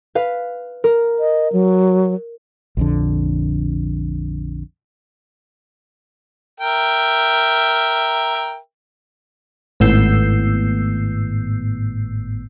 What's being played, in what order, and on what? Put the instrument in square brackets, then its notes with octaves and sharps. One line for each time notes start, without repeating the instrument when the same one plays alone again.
[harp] B4 F5
A#4
[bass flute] D#5
F#3
[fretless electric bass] A#1 F2 D3
[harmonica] A#4 E5 G5
[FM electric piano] G#1 A2 B3 E6 G6 C7